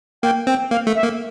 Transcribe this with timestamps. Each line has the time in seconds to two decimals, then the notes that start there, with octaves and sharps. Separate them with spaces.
0.23 A#3 G5
0.47 C4 G5
0.71 A#3 F5
0.87 A3
0.95 E5
1.03 A#3